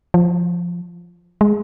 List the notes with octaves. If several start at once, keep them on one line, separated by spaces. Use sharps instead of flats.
F3
G#3